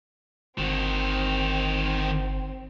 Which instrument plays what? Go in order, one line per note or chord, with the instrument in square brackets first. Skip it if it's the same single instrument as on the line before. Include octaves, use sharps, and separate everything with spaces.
[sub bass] G1 [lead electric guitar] D#3 F#4 [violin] C4